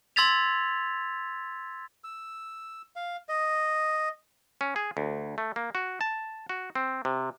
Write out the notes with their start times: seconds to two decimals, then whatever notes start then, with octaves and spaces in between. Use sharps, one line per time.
0.16 C6 E6 G#6 A6 B6 F7
2.04 E6
2.96 F5
3.29 D#5
4.61 C#4
4.76 G#4
4.97 D2
5.38 A3
5.56 A#3
5.75 F#4
6.01 A5
6.49 F#4
6.75 C4
7.05 C3